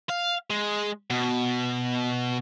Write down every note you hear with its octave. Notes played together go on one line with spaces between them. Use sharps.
F5
G#3
B2